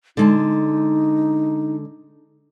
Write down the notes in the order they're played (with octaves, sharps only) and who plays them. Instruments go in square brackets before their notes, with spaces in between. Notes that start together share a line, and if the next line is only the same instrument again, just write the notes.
[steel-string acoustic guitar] D3 G#3 A5 [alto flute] D#4